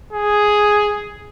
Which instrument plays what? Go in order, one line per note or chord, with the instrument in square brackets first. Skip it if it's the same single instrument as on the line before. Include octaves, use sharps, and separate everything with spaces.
[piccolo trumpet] G#4